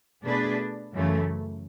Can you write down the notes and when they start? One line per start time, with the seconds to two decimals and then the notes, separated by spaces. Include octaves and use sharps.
0.24 B2 A3 D4 G#4 B4
0.93 F#2 C#3 E3 A3